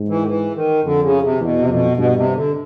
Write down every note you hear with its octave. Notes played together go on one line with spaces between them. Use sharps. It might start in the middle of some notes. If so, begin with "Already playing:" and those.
Already playing: G#2
E3
D#3
E3
D#3
F2 D3
C#3
C3
E2 B2
C3
F2 B2
G2 B2
C3
D3